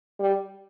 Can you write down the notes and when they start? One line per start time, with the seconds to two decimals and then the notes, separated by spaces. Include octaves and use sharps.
0.20 G3